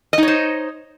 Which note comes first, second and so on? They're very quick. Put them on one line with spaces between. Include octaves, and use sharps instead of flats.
D#5 D#4 C#5 C5